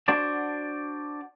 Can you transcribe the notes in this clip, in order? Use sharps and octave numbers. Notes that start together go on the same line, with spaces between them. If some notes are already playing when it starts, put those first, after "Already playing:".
D4 F#4 C5 D5 A5